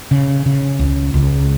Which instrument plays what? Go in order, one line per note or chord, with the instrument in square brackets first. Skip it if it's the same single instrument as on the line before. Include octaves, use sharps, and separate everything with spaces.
[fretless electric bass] C#3
C#3
C#2
C#2